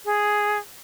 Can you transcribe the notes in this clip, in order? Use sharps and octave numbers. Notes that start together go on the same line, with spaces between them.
G#4